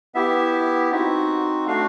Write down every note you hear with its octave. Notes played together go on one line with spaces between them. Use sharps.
B3 E4 G4 E5
C4 D#4 F#4
A3 D4 F#4 F5